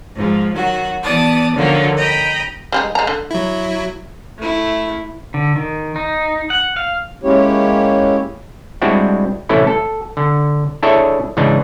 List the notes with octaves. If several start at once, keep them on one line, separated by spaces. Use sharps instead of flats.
G#2 F3
D#3 F#3 F#4
E3 B3 D5 A5 D#6
D3 D#3 F3 F#3 A#3
D#5 G5 A#5 B5
G3 G#3 D#4
G#3 A#5
D3
F#3 E4
A3 E4
D3
D#3
D#4
F#5
F5
G#3 A#3 C#4 E4 G4 C#5
G3 G#3 C4 D4 E4 F#4
A2 C3 E3 A3 C#4 E4
A4
D3
D4 E4 G#4 A4 C#5 E5
G#2 C#3 E3 D4 D#4